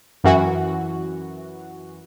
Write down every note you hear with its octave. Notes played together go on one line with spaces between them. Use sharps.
F#2 E3 F#4